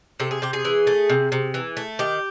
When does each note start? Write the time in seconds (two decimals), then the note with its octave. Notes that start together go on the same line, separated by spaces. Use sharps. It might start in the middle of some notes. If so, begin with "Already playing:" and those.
0.20 C3 A4
0.31 G#4
0.42 C3 G4
0.53 G#4
0.65 E3
0.87 A3
1.09 C3
1.32 C3
1.54 E3
1.77 A3
1.99 D#3 G4